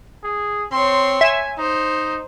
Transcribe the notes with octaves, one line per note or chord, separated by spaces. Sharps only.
G#4
C4 C#5 C6
E5 G#5
D#4 C5